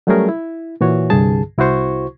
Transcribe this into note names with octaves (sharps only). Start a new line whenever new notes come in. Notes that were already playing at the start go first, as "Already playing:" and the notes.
F#3 G3 A3 C#4 G#4 A#4
E4
A#2 E3 F#4 C#5
C2 G2 D3 G#4 A5
C2 E4 F#4 C5 C#6